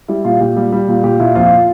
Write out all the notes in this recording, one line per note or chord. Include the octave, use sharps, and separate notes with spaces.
G3 E4
A#2 F4
A#2 G4
G3
G3
A#2
A#2 G4
A#2 E4
F2 F4